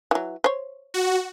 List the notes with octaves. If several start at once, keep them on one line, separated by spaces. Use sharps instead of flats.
E3 F#3
C5 C#5
F#4